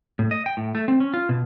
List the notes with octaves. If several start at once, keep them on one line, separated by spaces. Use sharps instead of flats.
A2
D#5
G5
A2
A3
C4
C#4
F4
B2